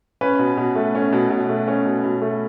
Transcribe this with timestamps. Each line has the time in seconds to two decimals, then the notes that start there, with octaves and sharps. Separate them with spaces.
0.21 C#4 B4
0.39 B2
0.57 B2
0.75 A3
0.95 C#4
1.13 B2
1.30 B2
1.49 A3
1.68 C#4
1.85 B2
2.04 B2
2.21 A3